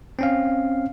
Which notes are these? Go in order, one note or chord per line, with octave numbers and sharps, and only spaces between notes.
C4 C#4 F5